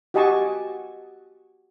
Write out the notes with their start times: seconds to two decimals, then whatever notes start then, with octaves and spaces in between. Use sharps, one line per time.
0.14 F#4 G4 D#5 G#5 A5 C#6